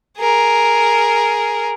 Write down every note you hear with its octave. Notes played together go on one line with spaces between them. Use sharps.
G#4 A#4